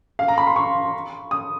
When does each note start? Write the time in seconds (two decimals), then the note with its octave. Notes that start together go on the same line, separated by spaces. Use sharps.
0.19 F5
0.28 A#5
0.38 B5
0.47 C6
0.56 C#6
1.31 D#6